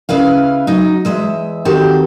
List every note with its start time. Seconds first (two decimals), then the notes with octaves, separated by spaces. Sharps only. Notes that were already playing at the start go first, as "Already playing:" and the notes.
0.09 C#3 E4 B4 F5
0.67 F#3 D#4
1.05 E2 G#3 E5
1.65 D#3 C4 F#4 G4 A4